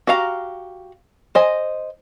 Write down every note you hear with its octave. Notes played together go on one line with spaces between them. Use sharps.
F#4 G4 F5 A#5
C5 D#5 G#5